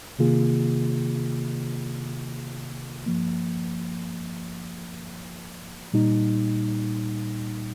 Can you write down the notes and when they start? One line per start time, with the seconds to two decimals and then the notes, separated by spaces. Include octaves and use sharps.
0.19 C3 D#3 A#3 F4 G#4
3.06 G2 F3 A#3
5.94 A#2 G3 A#3 D#4